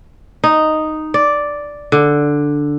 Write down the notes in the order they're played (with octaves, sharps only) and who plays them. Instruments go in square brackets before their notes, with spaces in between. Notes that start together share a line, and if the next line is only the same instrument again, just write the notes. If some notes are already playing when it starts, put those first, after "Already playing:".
[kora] D#4
D5
D3